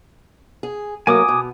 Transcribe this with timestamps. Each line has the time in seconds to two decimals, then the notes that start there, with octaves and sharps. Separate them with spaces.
0.63 G#4
1.07 F#3 A3 A#3 G#5 D6 D#6
1.28 B2